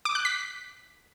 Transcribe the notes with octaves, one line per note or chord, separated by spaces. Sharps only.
D6
F#6
B6